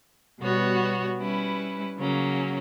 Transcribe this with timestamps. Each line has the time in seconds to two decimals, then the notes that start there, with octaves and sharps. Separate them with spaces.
0.40 B2 G3 B3 F#4 C#5
1.18 G3 C#4 E4 B4
1.98 C#3 F#3 A#3 C#4